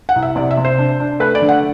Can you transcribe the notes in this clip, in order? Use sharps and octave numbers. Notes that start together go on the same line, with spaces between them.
F#5
C2
E5
C3 D5
E5
C3
C5
D4
D4
A3 B4
D5
D3
F#5